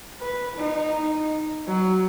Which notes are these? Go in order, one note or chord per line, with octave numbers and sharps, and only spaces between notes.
B4
D#4
F#3